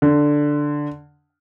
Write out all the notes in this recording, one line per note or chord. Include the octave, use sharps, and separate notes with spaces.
D3